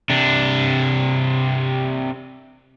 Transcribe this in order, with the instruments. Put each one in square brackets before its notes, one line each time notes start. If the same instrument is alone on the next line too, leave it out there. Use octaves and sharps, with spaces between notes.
[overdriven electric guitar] C3 D4